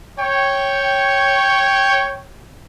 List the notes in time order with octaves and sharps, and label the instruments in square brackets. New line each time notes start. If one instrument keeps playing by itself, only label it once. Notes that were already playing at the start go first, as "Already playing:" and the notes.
[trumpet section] C#5 G5